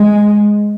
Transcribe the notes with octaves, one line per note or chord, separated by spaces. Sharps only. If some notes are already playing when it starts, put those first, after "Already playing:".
Already playing: G#3